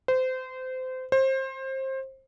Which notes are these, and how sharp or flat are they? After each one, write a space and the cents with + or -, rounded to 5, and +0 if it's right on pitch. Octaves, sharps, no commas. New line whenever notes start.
C5 -25
C5 +25